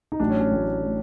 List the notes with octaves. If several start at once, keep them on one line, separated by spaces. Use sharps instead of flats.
D#4
A1 A2 F#3 D4
C#4
C#4
A1 A2 F#3
A2 F#3